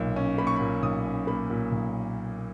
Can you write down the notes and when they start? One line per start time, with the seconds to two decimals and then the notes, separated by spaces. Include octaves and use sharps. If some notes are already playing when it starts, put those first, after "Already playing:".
Already playing: B1 A#2 A#3
0.16 C#4
0.38 A#3 B5
0.47 C#6
0.56 A#2 B5
0.82 B1 D#6
1.05 C#4
1.27 A#3 B5
1.50 A#2
1.72 B1